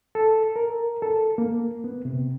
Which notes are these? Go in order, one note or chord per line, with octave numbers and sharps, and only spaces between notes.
A4
A#4
A4
A#3
B3
C3